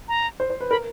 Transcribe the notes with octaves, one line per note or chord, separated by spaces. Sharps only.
A#5
C5
C5
B4
A#4 B5